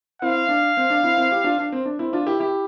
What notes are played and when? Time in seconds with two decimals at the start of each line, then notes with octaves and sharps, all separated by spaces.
0.22 C4 E4 F5
0.49 D4
0.77 C4
0.90 D4
1.03 C4 E4
1.17 C4 E4
1.31 E4 G4
1.44 D4 F4
1.58 D4
1.72 C4
1.85 D4
1.99 C4 E4
2.13 D4 F4
2.26 E4 G4
2.40 E4 G4